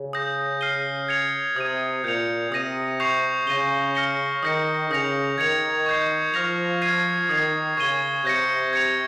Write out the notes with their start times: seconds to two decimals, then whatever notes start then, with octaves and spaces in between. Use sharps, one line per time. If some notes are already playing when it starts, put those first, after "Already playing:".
Already playing: C#3
0.13 D#6 G6 A#6
0.61 F6 C7 D#7 G7
1.08 G#6 C#7 F7
1.56 C3 D#6 G#6 D#7
2.04 A#2 G6 C#7 F7
2.52 C3 D#6 A#6 D#7
3.00 C#6 G6 C7 F7
3.47 C#3 G6 A#6 D#7 G7
3.95 F6 A#6 C#7 G7
4.43 D#3 D#6 G6 A#6 C#7
4.91 C#3 D#6 G6 A#6 C#7 F7
5.38 D#3 G#6 C#7 F7
5.86 C#6 G6 C7
6.34 F3 C#6 F6 A#6 F7
6.82 F6 G#6 C7 D#7
7.29 D#3 D#6 G#6 C7 F7
7.77 C#3 C#6 G#6 D#7 G7
8.25 C3 G6 A#6 C#7
8.73 G#6 C#7 F7